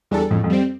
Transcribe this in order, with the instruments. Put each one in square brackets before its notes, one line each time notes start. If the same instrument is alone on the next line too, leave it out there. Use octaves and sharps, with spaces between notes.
[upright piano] E2 [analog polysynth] G3 D4 A4
[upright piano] F2 [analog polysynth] A2
[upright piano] F2
[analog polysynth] G3 C4